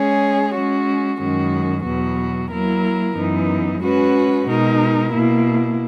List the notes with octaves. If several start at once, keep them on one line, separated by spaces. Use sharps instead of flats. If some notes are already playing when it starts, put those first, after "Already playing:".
Already playing: G#3 C#4 G#4 C#5
G#3 C#4 F#4
F#2 D#3 G#3 C#4 F#4
E2 B2 F#3 B3 F#4
F#3 A#3 E4 A#4
F#2 E3 B3 D#4
G#3 C#4 F#4 B4
B2 G#3 D#4 A#4
B2 A#3 E4